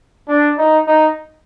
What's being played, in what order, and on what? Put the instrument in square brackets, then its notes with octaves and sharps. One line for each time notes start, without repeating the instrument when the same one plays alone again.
[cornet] D4
D#4
D#4